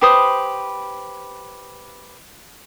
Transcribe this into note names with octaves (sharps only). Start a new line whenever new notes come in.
G4 B4 C5 D#6